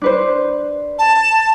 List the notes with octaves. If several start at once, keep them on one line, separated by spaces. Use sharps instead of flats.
D4 B4 C5
A5